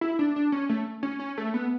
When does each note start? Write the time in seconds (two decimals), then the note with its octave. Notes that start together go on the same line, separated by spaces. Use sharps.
0.01 E4
0.19 D4
0.36 D4
0.52 C#4
0.69 A3
1.03 C#4
1.20 C#4
1.38 A3
1.54 B3